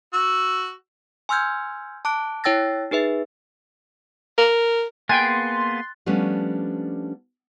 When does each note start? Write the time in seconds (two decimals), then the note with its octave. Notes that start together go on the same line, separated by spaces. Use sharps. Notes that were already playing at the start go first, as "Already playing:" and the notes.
0.14 F#4 E6
1.29 G#5 C6 E6 F6 G6 G#6
2.05 A5 D6 F#6 D7
2.44 E4 C#5 G5 E6 A6 A#6
2.91 D#4 G#4 B4 E5
4.38 A#4
5.09 A#3 B3 G#4 G5 G#5 C6 F#6 A6
6.06 F3 G3 A3 B3 C#4 D4